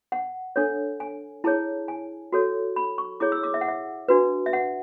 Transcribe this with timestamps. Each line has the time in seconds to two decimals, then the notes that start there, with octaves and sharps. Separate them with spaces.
0.12 F#5
0.56 D4 A4 C#5
1.00 G#5
1.44 E4 G#4 C#5 A5
1.88 G#5
2.32 F#4 A4 C#5
2.76 B5
2.98 C#6
3.20 E4 G#4 C#5 D6
3.32 E6
3.43 D6
3.54 E5
3.61 F#5
3.68 E5
4.08 D4 F#4 B4
4.46 E5
4.53 F#5